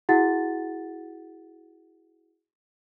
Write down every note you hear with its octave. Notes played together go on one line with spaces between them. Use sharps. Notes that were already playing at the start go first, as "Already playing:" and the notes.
E4 F#4 G#4 F#5 A6